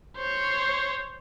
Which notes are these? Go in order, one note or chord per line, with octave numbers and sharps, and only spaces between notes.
C5 C#5